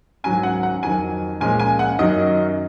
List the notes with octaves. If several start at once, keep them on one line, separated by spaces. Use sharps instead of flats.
G#2 D#3 F#3 C#4 G#5
F#5
F#5
F2 D#3 F#3 G#5
A#2 F3 G#3 C#4 G#5
G#5
F#5
F#2 D#3 F#3 C#4 D#5